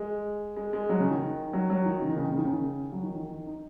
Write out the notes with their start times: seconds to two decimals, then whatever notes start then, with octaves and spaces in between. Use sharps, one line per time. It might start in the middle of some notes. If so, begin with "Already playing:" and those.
Already playing: G#3
0.57 G#3
0.73 G#3
0.89 F#3
1.00 C#3
1.10 D#3
1.53 F#3
1.70 F#3
1.85 D#3
2.02 C#3
2.08 D#3
2.17 C#3
2.23 D#3
2.31 C#3
2.38 D#3
2.44 C#3
2.92 F#3
3.03 D#3
3.15 D#3
3.31 D#3
3.47 D#4